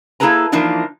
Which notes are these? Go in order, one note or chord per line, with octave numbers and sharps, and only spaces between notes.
A#3 E4 G#4 A4 B4 A#5
E3 F3 A#3 D4 D#4